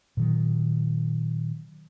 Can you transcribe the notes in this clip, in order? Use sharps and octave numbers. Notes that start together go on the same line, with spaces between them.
A#2 D#3 F#3